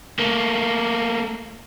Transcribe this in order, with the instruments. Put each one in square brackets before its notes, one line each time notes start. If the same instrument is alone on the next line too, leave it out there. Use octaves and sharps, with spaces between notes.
[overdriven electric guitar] A3 A#3